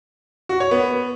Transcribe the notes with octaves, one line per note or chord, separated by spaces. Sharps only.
F#4
C#5
B3